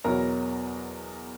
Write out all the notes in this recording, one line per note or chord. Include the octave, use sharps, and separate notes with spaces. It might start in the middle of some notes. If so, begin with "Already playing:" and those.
E2 B2 F#3 A#4 A#5